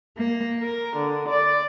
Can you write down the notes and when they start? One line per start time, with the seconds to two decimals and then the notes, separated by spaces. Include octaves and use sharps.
0.17 A#3
0.60 A#4
0.97 D3
1.29 D5